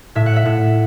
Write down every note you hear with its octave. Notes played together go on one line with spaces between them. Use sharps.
A2 E5
F#5
E5
A2